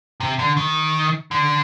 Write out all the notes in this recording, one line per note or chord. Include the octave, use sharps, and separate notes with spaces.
C3
D3
D#3
D3